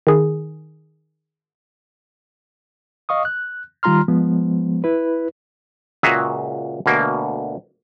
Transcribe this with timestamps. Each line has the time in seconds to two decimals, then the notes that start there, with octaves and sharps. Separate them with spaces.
0.07 D#3 G#4
3.09 D#5 F5 C#6 D#6
3.25 F#6
3.83 D#3 G3 F4 A#5 C6 F6
4.08 F3 G#3 B3
4.84 E4 B4
6.03 C#2 A#2 F#4 G#4 E5 A#5
6.86 D2 B2 A#3